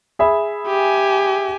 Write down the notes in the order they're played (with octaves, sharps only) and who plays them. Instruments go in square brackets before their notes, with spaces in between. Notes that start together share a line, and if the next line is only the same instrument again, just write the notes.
[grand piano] G#4 E5 B5
[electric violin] G4 G#5